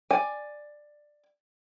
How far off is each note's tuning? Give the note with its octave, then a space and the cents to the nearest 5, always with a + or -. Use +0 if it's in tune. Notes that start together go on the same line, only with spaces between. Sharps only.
D5 +10 G#5 +0